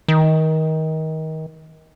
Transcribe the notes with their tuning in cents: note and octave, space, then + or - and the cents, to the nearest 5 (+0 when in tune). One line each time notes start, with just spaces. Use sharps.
D#3 +25